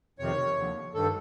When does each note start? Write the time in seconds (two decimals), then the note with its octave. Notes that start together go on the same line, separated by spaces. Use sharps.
0.19 F2 C3 D#3 C#5
0.57 D#2 D3 F3
0.94 G2 D#3 A4